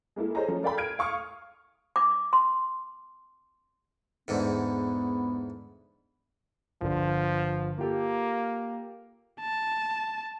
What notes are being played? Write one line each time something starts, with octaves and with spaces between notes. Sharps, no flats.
G#3 A#3 E4 A4
G#4 A4 C5 C#5 D#5 A#5
F3 A3 C#4
A4 A#4 D5 F5 G5 B5
F6 G#6 D7 D#7
F5 C#6 D#6 F6
D6
C6
E2 G#2 D3 B3
G1 D3 F3
A#3 F4 G4 A4
A5